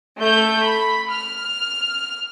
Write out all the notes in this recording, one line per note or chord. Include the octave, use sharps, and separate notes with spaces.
A3 G6
B5
F6